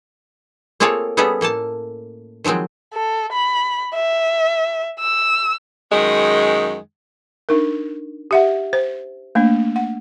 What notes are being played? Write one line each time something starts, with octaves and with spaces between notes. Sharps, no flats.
A#3 C4 F4 G#4 A4 C#5
G3 B3 C#4 G#4 A4
A2 A#3 A4 A5
D#3 F3 F#3 G#3 C4
A4
B5
E5
E6
F#2 D#3 G#3
D4 D#4 A#4
G4 E5 F#5
C5
A3 A#3 D4
F#5